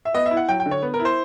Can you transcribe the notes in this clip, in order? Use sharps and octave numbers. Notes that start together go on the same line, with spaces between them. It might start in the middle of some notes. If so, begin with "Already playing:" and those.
E5
B3 D#5
E5
E4
F#5
F#3 G5
G5
D3
C#5
B3
A#4
E4
C5